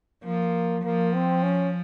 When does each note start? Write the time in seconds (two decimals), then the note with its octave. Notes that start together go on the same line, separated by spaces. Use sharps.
0.23 F3 A#3
0.84 F3 A#3
1.13 C4
1.43 C#4